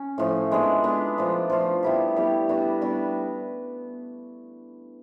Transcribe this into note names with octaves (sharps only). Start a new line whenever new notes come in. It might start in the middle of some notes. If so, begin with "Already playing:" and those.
Already playing: C#4
A2 F3 A3
G#3 B3 D4
G#3 B3 D4
F3 A3 D4 F4
F3 A3 D4 F4
G3 B3 E4 G4
G3 B3 E4 G4
G3 B3 D4 F#4
G3 B3 D4 F#4